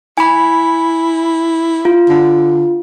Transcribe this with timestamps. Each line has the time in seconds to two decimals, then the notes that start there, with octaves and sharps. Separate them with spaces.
0.18 E4 G#5 B5
1.85 F4
2.09 D3